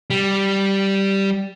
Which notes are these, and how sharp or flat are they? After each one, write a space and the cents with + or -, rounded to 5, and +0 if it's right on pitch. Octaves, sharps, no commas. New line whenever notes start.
G3 -5